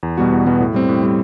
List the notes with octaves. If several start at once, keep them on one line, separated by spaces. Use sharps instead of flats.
E2
B2 G3 B3 F#4
E2
B2 G3 B3 F#4
A2
G3 C4
A2
G3 C4